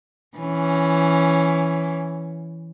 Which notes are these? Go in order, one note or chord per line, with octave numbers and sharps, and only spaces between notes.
E3 C#4